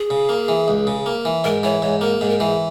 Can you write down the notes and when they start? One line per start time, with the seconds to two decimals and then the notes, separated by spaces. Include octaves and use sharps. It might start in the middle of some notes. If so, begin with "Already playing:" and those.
Already playing: G#4
0.10 C#3
0.29 A#3
0.48 E3
0.68 C#2
0.87 C#3
1.06 A#3
1.25 E3
1.44 G#2 A#4
1.63 E3 C#5
1.82 G#2 C#5
2.01 A#3 A#4
2.21 G#2 G#4
2.29 A#4
2.39 E3 G#4